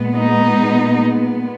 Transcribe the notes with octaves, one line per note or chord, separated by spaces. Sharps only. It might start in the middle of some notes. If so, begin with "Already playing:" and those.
Already playing: A#2 G#3 B3
D#4